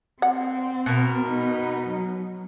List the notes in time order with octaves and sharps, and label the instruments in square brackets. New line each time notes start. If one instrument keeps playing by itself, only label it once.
[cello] C4 [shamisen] F#5
[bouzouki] B2 A#4
[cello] B3 D#4
F#3